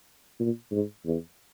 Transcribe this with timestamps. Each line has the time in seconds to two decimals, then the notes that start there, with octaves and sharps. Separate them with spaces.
0.40 A#2
0.72 G#2
1.05 E2